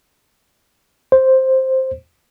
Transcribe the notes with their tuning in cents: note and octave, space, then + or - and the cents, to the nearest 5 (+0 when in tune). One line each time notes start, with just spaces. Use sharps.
C5 +5